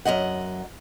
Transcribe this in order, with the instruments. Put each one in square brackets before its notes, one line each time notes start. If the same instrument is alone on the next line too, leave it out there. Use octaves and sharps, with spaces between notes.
[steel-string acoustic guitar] F#2 E3 D#5 F#5